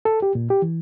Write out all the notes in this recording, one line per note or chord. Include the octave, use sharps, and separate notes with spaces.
A4
G4
A#2
G4
E3